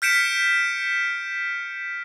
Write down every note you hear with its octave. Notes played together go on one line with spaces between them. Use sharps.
F6 G6 B6 C#7 D7 E7